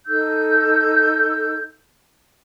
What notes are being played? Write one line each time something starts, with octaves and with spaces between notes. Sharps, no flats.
D#4 A4 E6 G6